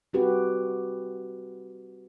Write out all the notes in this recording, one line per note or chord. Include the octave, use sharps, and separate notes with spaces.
G3 C4 F#4 G4 B4